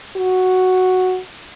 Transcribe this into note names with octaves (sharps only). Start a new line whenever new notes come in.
F#4